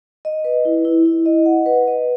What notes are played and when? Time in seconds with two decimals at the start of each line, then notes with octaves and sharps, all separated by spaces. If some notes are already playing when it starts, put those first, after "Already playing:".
0.25 D#5
0.44 B4
0.65 E4
0.85 E4
1.06 E4
1.26 D#5
1.46 F#5
1.66 B4
1.87 D#5